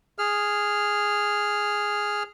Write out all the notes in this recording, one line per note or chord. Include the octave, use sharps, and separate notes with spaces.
G#4 F6